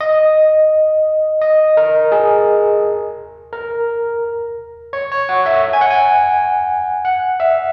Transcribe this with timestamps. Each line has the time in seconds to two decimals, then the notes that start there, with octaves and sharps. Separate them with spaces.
0.01 D#5
1.42 D#5
1.77 A#4
2.12 G#4
3.53 A#4
4.93 C#5
5.12 C#5
5.29 F#5
5.46 E5
5.73 G#5
5.81 F#5
5.90 G#5
7.05 F#5
7.40 E5